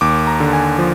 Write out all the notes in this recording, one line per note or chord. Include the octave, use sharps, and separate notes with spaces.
D#2 D6
A#5
D3
G#5
F3